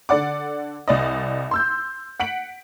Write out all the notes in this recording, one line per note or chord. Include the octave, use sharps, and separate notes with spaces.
D3 D4 D5 F#5 D6
C2 D5 D#5
C6 E6 G6
F#5 B6 D7 F#7